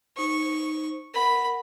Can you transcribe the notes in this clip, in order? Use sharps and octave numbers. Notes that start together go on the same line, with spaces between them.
D#4 C5 C#6
A#4 F#5 B5